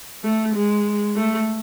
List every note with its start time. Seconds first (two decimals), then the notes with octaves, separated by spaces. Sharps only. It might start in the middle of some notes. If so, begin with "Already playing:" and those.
0.24 A3
0.55 G#3
1.15 A3